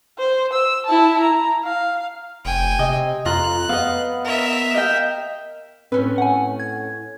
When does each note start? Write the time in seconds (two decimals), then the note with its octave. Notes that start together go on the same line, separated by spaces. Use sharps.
0.19 C5
0.53 E6
0.86 E4 A5
1.21 A#5
1.65 F5
2.45 F1 G5 G#5
2.79 C3 D#5
3.25 F2 F4 A#5 F#6
3.69 B3 D#5 F5
4.24 A#4 E5
4.74 D#5 F5 G5
5.92 A2 C4 C#4 B4
6.18 F#5 G#5
6.60 G#6